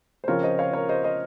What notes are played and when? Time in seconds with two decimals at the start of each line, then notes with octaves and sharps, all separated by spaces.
0.24 C5
0.28 C#3 F3 C4 F4 A#4 C#5
0.43 C5 D#5
0.59 C#5 F5
0.73 A#4 C#5
0.89 C5 D#5
1.04 C5 D#5